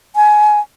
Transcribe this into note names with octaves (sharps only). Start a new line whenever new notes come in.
G#5